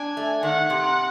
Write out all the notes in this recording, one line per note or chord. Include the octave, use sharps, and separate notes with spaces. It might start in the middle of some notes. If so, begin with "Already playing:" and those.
Already playing: D4 G#5
A3
D#3 F#5
C3